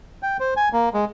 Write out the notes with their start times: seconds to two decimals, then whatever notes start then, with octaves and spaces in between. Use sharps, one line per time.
0.23 G5
0.40 C5
0.57 G#5
0.73 A#3
0.94 G#3